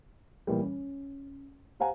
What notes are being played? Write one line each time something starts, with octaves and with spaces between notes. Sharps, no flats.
A#2 E3 G3
C#4
G4 C5 F5 F#5 G#5 A#5